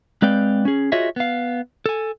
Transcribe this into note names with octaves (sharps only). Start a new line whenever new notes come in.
G#3 C4 B4 D5 F5 G5
C#4 G#4
F4 F#4 G#4 C#5 D#5 E5
B3 F5
A4 G#5